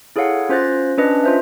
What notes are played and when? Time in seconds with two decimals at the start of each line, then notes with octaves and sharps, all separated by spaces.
0.16 E4 G#4 A4 C#5 F5 F#5
0.49 C#4 F4 C5 F#6 A6 A#6
0.98 C#4 D4 B4 D5 D#5
1.24 F4 C5 E5